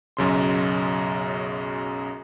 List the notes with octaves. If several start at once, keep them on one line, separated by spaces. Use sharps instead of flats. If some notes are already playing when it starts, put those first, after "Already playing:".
B1 F#2 C#3 C6